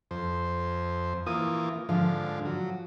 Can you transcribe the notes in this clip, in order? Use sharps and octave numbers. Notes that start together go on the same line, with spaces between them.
F2 C5
E3 A#3 F4 D#6
G#2 D3 F3 F5
F#3